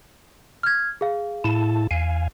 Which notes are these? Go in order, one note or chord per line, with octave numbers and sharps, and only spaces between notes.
F6 G#6
G#4 F5
A2 E4 A5
E2 F5 G#5